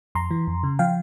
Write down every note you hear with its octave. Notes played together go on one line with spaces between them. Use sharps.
F2 A#5 C6
E3
F2
C#3
F3 F5 G5